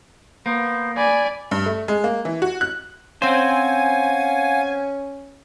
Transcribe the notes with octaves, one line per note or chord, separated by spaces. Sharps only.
A#3 B3 C5
D5 G#5 B5
G2
A3
G#3
A#3
E3
F#4
F#6
C4 C#4 C5 F5 F#5 G#5